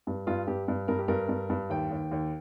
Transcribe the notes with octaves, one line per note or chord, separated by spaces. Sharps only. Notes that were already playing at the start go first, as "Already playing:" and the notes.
G2
G2 F4
G2 G4
G2
G2 A#4
G4
G2 A#4
G2
G2
D#2 G5
D#2
D#2